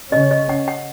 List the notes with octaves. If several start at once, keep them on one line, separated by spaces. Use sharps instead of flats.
C#3 C#4 D#5
D#5
F#5
F#5